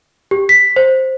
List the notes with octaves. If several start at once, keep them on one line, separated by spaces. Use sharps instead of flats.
G4
B6
C5